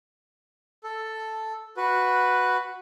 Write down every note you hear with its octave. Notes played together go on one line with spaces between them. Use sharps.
A4
F#4 B4